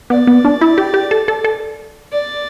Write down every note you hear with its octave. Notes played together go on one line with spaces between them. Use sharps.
B3 D5
B3
D4
E4
G4
G4
A4
A4
A4
D5